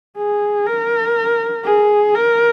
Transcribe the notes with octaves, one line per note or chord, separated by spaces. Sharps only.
G#4
A#4
G#4
A#4